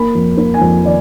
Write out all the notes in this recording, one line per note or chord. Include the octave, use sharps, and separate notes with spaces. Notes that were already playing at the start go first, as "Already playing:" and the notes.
Already playing: A#3 B5
F2
A#3
G#5
F2
D#3 D5